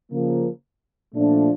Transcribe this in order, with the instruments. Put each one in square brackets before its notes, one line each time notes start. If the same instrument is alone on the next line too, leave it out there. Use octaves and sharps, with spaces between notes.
[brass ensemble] C#3 F3 A#3
A#2 F3 A3 D4